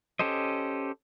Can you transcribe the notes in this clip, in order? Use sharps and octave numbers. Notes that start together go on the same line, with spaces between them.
C#4 G4 A4 C5 D#5